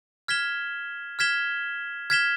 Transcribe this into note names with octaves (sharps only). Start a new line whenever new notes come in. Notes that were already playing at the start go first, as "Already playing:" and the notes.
F6 G#6 B6 E7 G7
F6 G#6 B6 E7 G7
F6 G#6 B6 E7 G7